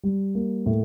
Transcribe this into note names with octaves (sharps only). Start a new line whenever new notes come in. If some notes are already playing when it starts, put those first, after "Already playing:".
G3
A#3
A2